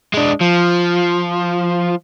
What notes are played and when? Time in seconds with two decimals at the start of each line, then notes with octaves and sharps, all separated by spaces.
0.14 G#3 D4
0.41 F3